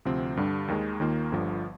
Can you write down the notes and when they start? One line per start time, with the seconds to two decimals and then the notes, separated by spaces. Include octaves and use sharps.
0.05 D2 C3 F3 C4
0.37 G2 D3 G3 D4
0.68 D#2 D#3 G#3
1.00 D#2 D#3 A#3 F4
1.32 G1 G2 D3 F3